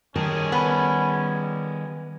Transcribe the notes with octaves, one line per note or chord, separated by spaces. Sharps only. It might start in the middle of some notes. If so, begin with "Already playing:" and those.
D#3 G3 C#4 G#4 A#4 A5
B3